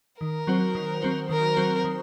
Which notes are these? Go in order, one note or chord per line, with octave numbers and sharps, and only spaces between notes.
D#3 A#4
F#3 C4 F#4 C5
D#3
F#3 C4 F#4 C5
D#3 A#4
F#3 C4 F#4 C5
D#3